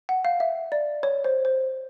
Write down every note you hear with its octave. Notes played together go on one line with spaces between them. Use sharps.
F#5
F5
E5
D5
C#5
C5
C5